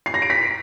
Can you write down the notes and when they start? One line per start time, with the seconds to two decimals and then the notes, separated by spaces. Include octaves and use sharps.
0.06 C7
0.14 A#6
0.22 D7
0.30 B6